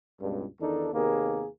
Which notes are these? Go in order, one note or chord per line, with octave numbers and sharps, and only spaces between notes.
C#2 G2 B2
E2 D#3 D4 D#4 A4
D#2 C3 A#3 B3 G#4 A#4